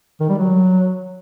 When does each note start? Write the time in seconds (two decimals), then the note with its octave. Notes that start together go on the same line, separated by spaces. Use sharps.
0.20 D#3
0.29 G3
0.38 F#3